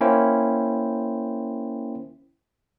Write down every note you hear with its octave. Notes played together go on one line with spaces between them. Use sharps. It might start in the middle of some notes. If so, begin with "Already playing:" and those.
A#3 C#4 E4 C5 G5